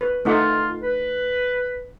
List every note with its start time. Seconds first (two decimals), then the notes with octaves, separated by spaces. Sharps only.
0.01 B4
0.25 A3 D#4 F4 F#5
0.82 B4